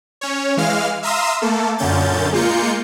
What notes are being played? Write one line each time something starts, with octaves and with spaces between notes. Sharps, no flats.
C#4 C#5
E3 G#3 F5 F6
E5 F5 A#5 C6 D#6 E6
A3 A#3 A4
F#2 A#2 D3 C#4 G6 A6
G#3 A#3 F4 G6 C#7